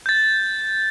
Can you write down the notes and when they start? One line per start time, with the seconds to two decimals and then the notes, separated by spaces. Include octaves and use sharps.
0.06 G6 A6